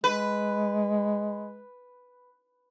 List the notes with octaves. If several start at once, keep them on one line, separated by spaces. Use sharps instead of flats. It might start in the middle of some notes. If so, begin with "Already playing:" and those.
G#3 B4